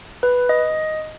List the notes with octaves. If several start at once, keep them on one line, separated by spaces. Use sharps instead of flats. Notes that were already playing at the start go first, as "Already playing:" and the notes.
B4
D#5